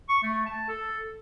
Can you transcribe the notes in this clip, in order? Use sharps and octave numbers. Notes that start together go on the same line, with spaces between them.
C#6
A3
A5
A4